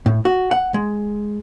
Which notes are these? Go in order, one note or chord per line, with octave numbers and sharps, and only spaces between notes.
A2
F#4
F#5
G#3